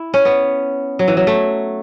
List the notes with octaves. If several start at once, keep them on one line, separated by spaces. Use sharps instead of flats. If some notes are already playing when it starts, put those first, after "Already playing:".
Already playing: E4
C#4
B3
F#3
E3
F#3
A3